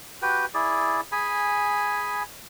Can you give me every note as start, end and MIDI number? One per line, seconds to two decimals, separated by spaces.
0.22 0.46 66
0.22 0.46 67
0.22 0.46 71
0.22 0.46 79
0.54 1.01 64
0.54 1.01 68
0.54 1.01 74
1.12 2.23 68
1.12 2.23 80
1.12 2.23 83